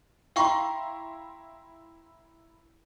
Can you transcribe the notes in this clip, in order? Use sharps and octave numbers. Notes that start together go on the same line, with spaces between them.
E4 F5 G5 A#5 C6 C#6